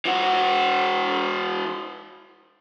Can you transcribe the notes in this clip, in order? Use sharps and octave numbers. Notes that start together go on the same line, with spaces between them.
E3 F#4